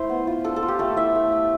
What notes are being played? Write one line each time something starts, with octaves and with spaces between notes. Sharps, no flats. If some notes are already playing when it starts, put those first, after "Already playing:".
Already playing: A3 E4 C5 E5
B3
F4
D4 A4
A4
F4
G4
A3 A4
E4 E5
A3
A3